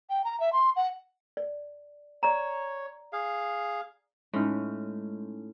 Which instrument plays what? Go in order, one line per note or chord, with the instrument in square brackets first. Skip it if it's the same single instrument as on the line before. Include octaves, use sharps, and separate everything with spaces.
[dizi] G5
A#5
E5
C6
F#5
[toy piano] D5
[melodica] C#5 [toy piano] D5 A#5
[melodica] G#4 F5
[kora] A2 [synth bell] G#3 C#4 D#4